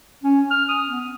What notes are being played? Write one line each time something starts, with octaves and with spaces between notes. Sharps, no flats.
C#4
F6
D#6
B3